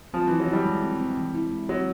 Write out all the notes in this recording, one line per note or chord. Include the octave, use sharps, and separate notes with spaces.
F3 C4
E3 E4
F#3
G3 E4
G#3
C4
C4
E3
E4
G#3
F#3 C4